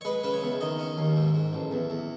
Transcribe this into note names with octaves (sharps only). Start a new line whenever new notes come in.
C#5
G#3 B4
C#3 B4
C#5
E2
D#3 D#5
C#4
D#2
G#2
G#2
A1
E2
E2